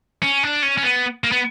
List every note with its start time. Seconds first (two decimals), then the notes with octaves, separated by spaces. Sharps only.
0.23 C#4
0.43 D4
0.63 C#4
0.78 C#4
0.83 B3
1.24 A#3
1.32 B3